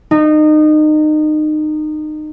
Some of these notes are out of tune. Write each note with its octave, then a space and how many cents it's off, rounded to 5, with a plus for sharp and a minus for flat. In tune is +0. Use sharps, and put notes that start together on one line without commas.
D#4 -25